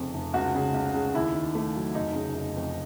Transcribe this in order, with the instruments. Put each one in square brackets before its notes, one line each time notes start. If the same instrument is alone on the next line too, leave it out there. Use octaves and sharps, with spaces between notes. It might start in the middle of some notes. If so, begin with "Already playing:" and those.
Already playing: [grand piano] F1 F2 C#3
F1
C#2 F#4
C#3
C#2
C#3
D#2 E4
D#3
A3
F#3
F1 D#4
C#3
F1
F2